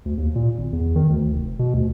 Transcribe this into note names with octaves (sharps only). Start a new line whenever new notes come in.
D2
D#2
A#2
G#1
E2
D#3
D2
F1
B2
D2